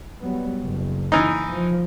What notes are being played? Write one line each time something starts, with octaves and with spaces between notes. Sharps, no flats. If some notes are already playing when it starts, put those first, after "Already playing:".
F#3 G3 B3
F#1
E3 D#4
F3